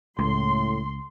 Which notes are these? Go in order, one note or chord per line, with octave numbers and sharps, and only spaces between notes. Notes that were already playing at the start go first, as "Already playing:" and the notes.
C#2 A2 C6